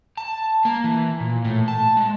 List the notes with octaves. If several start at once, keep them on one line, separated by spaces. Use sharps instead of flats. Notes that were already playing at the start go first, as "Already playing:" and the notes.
A5
A#3
E3
A#2
A2
A5
G#3